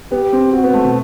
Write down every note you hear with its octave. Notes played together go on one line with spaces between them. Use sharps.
B3 G4
C4
C4 F#4
B3
A3
B2